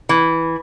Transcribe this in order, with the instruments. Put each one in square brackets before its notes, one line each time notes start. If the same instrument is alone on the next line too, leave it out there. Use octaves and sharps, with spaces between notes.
[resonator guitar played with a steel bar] E3